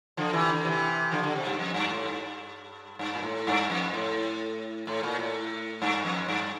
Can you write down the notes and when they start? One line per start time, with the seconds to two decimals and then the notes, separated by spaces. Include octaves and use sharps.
0.17 D3 F3
0.33 C3 E3
0.49 D3
0.64 C3 E3
1.11 D3 F3
1.23 D3
1.35 C3
1.47 G2
1.59 F2
1.74 G2
1.90 A2
2.06 G2
2.99 G2
3.15 A#2
3.23 A2
3.47 G2
3.70 F2
3.94 A2
4.87 A2
5.03 A#2
5.19 A2
5.82 G2
6.05 F2
6.28 G2